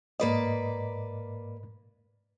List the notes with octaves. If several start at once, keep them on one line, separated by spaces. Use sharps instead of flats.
G#2 A#3 B4 D5 D#5